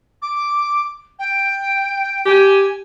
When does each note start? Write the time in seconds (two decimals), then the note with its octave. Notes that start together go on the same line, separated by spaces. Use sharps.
0.22 D6
1.19 G5
2.25 G4 G#5